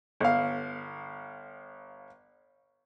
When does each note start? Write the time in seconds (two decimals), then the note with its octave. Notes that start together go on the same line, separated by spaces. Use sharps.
0.20 G1 F5